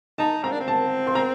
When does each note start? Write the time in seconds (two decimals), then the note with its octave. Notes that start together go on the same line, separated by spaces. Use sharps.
0.18 D#4 A5
0.44 C4 A#5
0.52 D4
0.60 C4
0.68 A5
1.07 C6
1.15 A#5